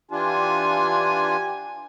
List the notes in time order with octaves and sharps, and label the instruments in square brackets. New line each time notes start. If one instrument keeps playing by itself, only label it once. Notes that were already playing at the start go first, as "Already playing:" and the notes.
[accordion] E3 D4 F4 [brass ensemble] G4 G#5